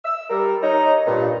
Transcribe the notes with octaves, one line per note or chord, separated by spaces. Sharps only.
E6
G3 A#4
D#4 C#5 A#5
G2 A#2